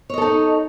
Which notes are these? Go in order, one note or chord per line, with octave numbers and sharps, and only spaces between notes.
D#4 A4 C#5 D#5